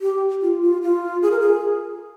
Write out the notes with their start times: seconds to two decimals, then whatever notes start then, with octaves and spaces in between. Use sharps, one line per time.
0.01 G4
0.42 F4
0.62 F4
0.82 F4
1.22 G#4
1.31 A#4
1.40 G#4